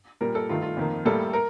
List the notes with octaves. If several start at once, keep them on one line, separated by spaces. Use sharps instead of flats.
A#2 G3 A#3 A#4
A4
G2 D#3 A3 F4
F4
F2 D#3 A#3
A2 G3 A#3 A4
A#4